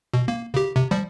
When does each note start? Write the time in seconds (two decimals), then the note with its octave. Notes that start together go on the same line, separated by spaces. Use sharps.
0.14 B2
0.28 A#3
0.54 C#3 G4
0.76 C3
0.91 F3 G3